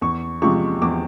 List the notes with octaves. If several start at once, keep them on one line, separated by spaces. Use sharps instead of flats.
E2 C#6
C3 F3 G#3 C#6
E2 D6